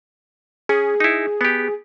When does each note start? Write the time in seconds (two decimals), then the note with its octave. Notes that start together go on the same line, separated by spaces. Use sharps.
0.69 C#4 G#4
1.00 D#4 E4
1.41 B3 G4